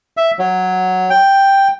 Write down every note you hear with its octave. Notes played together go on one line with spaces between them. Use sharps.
E5
F#3
G5